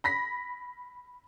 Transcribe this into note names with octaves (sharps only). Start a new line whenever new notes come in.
B5 A#6 B6